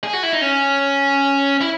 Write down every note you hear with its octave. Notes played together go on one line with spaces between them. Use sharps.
G#4
F#4
E4
D#4
C#4
E4